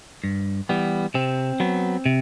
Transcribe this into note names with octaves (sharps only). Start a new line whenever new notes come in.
G2
E3 G3 B3
C3 C4
F#3 B3
C3